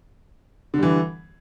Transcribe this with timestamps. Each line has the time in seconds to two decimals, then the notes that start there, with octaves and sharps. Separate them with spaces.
0.74 D3
0.78 G3
0.83 E3